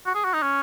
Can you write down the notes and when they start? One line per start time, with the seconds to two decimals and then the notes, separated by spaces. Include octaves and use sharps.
0.06 F#4
0.15 G#4
0.25 F#4
0.33 D#4
0.43 C#4